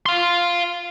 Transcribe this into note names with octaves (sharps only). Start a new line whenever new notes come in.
F5 C6